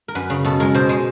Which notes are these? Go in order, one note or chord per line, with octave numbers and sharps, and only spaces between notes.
A#4
F#2 B4
C#3
B2 A4
G#3 A#4
B2 C5
G#3 C5